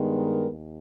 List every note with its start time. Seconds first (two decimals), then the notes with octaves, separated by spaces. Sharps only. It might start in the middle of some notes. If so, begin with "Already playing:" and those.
Already playing: G2 D#3 G#3 B3
0.13 A#4
0.50 D#2